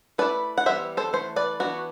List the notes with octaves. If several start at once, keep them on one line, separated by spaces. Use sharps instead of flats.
A3 E4 B4 D5
F#5
E3 G3 B3 C5 E5
A4 C5
E3 A3 C5
B4 D5
E3 B3 D4 F#4